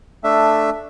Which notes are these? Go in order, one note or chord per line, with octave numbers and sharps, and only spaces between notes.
A3 D4 E5